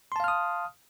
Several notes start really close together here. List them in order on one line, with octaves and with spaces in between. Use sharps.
C6 A5 F5 F6 D#6